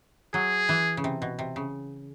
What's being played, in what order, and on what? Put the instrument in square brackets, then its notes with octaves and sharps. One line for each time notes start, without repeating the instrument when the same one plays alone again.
[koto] F#3 [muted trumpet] G#4
[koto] E3
C#3
C3
B2
C3
C#3